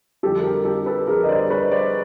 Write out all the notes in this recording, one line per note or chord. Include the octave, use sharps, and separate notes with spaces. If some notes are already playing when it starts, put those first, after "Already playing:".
F2 D3 G3 G4 A4
A#4
G4 A4
G4 A4
A4 B4
F2 D3 G3 G#4 A#4
D#5
C5 D5
B4 C#5
C5 D5